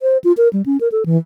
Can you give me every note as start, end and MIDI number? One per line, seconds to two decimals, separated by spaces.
0.02 0.18 72
0.24 0.33 65
0.37 0.48 70
0.53 0.62 55
0.66 0.77 61
0.81 0.88 70
0.92 1.03 69
1.06 1.17 52